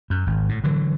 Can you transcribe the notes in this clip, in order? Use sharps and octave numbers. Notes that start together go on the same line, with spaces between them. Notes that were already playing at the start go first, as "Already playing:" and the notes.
F#2
G#1
A2
D3 E3 F#3